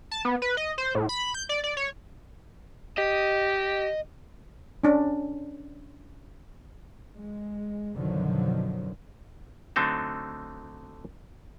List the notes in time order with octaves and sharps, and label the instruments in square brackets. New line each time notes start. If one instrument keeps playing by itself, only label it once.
[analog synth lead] A5
B3
B4
D#5
C5
A2
B5
G6
D5
D5
C#5
[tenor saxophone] G4 [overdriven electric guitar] D#5
[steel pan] C#4 D4
[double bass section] G#3
F#2 B2 D3 D#3 F3 F#3
[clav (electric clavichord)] D3 F#3 A3 C4 D#4 A4